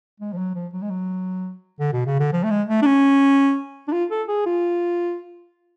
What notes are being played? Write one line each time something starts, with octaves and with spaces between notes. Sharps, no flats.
G#3
F3
F#3
F3
F#3
G#3
F#3
D3
B2
C#3
D3
F3
A3
G#3
A3
D4
C#4
D4
F4
A4
G#4
F4